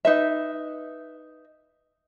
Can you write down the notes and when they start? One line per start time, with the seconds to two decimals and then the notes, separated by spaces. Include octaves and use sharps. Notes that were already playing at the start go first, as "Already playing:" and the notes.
0.05 D#4 B4 E5